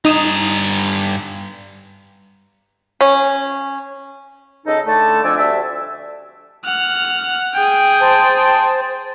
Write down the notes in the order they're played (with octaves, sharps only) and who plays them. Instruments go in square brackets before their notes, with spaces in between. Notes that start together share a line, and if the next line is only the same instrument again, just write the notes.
[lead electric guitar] G2 A#5 [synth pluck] D#4 D#6 E7
[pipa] C#4
[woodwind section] C#2 C#3 D#4 A4 D#5
D3 A3 A5
F2 F3 D4 D5 G#5 E6
D2 G3 E5 A5 E6
[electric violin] F#5 F6
G#4 G5
[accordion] C5 A5